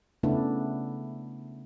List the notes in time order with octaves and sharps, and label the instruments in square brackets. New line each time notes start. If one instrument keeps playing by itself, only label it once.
[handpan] C#3 A3 B3 D4 E4